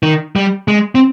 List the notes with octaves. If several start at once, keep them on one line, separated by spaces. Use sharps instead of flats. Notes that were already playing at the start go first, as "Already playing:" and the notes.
D#3
G3
G#3
C4